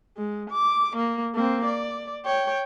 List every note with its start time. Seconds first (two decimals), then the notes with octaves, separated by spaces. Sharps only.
0.17 G#3
0.50 D6
0.97 A#3
1.34 A#3 C4
1.65 D5
2.26 C#5 G5